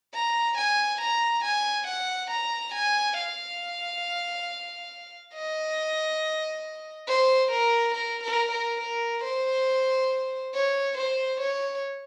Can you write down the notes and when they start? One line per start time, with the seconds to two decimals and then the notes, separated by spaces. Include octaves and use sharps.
0.15 A#5
0.58 G#5
1.01 A#5
1.45 G#5
1.87 F#5
2.31 A#5
2.74 G#5
3.17 F5
5.34 D#5
7.08 C5
7.52 A#4
7.95 A#4
8.24 A#4
8.52 A#4
8.81 A#4
9.24 C5
10.54 C#5
10.98 C5
11.41 C#5